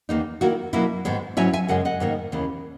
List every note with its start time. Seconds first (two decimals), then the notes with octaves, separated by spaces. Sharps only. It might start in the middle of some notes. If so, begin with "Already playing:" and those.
0.09 E2 D#3 A#3 D#4
0.41 D#3 A#3 E4 F#4
0.73 B2 F#3 A#3 E4
1.05 G#2 D#3 G#3 B3
1.37 G#2 F#3 C#4 E4 E5 G#5
1.53 E5 G#5
1.68 F#2 C#3 G#3 F#5
1.85 D#5 F#5
2.00 G#2 D#3 A#3 D#4
2.32 D#2 C#3 E3 B3